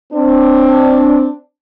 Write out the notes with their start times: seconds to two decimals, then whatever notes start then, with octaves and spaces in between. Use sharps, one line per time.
0.13 C4 D4